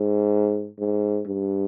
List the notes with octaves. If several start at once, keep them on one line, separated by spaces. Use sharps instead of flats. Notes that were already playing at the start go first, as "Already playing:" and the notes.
Already playing: G#2
G#2
G2